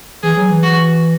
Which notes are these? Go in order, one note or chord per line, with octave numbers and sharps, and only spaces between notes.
E3 G#4
F#3
E3
F#4